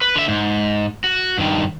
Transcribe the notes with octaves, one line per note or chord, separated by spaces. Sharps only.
B4
D3 E5
G#2
F#4
G2 D#3